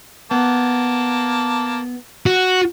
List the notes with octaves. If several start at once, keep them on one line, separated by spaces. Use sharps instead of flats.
A#3 B3 A5
F#4